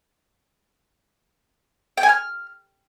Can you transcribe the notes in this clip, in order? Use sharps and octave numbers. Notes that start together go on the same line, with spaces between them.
G5
G#5
F6